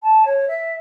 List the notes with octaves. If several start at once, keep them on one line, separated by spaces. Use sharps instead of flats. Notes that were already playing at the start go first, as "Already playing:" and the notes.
A5
C#5
E5